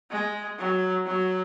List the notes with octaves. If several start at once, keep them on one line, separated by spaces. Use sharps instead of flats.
G#3
F#3
F#3